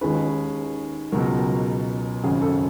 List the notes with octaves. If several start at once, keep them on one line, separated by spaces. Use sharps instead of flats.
D#2 D#3 G#3 C#4 B4
C#2 B2 F#3 A#4
G#1 F#2 C#3 G#4
A4